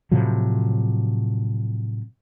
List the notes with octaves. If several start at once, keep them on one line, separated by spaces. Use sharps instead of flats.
A2 C3 F3 F#3